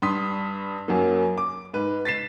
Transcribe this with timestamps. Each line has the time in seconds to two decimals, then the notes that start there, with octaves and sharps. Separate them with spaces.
0.02 G2 C6 D#6 B6
0.88 F#2 F#3 A#3
1.38 D6
1.74 G#2 B4
2.05 A6 B6 C7 E7